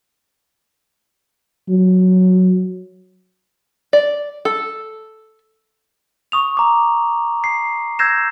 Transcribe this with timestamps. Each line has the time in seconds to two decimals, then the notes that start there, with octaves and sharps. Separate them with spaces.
1.69 F#3
3.93 D5
4.45 A4
6.32 C#6 D#6 F7
6.57 A#5 D6
7.44 C7
7.99 E6 G6 G#6 A#6 C7 E7